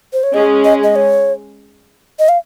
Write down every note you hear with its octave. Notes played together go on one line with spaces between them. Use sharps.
C5
C#5
G#3 C#4 G#4 D#5
D#5
D#5
C#5
D#5
F5